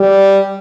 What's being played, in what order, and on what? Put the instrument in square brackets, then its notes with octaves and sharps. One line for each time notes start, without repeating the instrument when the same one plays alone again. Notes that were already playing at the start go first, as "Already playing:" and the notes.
Already playing: [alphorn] G3